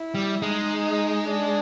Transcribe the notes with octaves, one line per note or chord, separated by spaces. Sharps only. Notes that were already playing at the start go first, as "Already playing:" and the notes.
Already playing: E4
G3
G#3 D#4
D4